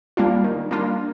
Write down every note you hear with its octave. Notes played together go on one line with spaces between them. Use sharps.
G3 A#3 D4 F4
D#3
G3 A#3 D4 F4